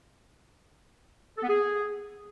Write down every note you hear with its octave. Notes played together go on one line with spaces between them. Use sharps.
A4
B3
G#4